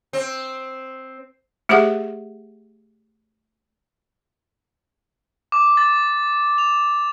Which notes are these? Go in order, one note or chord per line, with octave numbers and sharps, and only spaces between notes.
C4
A3 G4 G#4 C5 E5 F#5
D6
A6
F7